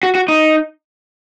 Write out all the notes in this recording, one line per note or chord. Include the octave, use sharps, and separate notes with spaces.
F#4
F#4
D#4